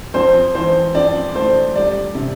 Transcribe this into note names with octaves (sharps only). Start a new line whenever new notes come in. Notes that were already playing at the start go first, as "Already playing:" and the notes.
F2 C5
E3 C5
F2 D5
A3 C5
G3 D5
C3